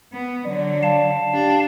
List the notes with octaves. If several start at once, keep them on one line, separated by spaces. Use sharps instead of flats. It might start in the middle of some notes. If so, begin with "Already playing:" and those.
B3
D3 F#3 D5
F5 A5
D4 G4